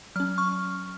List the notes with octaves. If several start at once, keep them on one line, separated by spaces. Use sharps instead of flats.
F#3 C#4 F6
C#6 F6